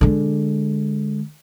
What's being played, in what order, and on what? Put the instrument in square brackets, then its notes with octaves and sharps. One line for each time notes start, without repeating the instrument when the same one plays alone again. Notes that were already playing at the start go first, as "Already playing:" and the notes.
[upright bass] D3 G#3